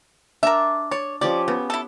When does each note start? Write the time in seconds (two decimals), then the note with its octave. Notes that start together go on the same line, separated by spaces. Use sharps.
0.43 D4 A#4 E5
0.91 C#5 D5
1.21 F3 C#4 G4 D5
1.48 C#3 B3
1.70 E4 A4